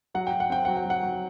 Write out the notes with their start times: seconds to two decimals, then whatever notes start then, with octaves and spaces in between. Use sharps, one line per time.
0.14 F#3 F#5
0.27 G5
0.32 F#3
0.40 F#5
0.50 C4 G5
0.65 F#3 F#5
0.77 G5
0.85 F#3
0.90 F#5
1.03 F#3